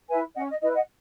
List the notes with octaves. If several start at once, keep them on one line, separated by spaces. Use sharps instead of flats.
E4 B4 E5 G#5
C#4 D#5 F#5
D#5
E4 B4 D#5
D#5 F#5